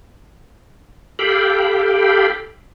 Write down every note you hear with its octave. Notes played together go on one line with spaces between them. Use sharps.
G4 A4 F5 G5 B5